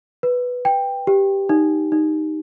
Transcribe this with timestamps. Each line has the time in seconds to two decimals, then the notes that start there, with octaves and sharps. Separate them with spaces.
0.23 B4
0.65 G5
1.07 G4
1.49 D#4
1.92 D#4